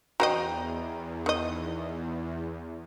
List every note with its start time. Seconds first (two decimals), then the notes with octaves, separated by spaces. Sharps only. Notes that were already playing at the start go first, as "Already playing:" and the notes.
0.20 E2 F#4 C5 D#5 G5 A#5
1.26 D#3 D#5